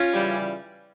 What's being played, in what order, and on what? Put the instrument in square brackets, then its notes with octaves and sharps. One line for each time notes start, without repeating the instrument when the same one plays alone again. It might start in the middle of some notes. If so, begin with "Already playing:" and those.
Already playing: [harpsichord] C#4 F4
[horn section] C#3 E3 G3